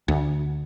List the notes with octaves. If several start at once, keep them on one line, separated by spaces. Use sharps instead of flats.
D2